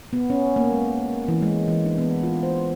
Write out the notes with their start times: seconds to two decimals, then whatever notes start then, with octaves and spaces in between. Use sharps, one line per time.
0.13 B3
0.30 C#4
0.56 A#3
0.72 G#3
1.28 E3
1.42 G#3
1.68 E3
1.86 D4
1.98 B3
2.23 F4
2.43 C5